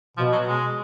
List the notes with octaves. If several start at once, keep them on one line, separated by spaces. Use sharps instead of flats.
B2 F3
F#3
G#3